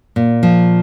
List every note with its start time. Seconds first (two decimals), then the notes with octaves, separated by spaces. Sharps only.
0.16 A#2
0.43 F3